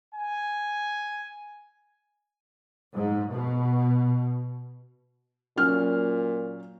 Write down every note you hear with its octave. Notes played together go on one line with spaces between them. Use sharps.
G#5
G#2
B2
A#2 F#3 C#4 F6